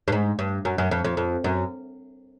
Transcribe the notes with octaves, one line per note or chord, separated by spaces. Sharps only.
G2
G#2
G2
F#2
F#2
F2
F2
F2
F#2